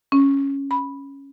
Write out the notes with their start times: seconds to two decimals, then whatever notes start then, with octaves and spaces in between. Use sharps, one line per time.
0.12 C#4
0.71 B5